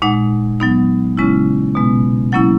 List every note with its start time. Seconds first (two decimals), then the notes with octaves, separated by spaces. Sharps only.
0.02 A#2 G#3 D#4 F#5
0.60 F#3 B3 D#4
1.17 C#3 G#3 C#4 E4
1.75 B2 G#3 B3
2.32 F#3 A#3 C#4 E4 F#5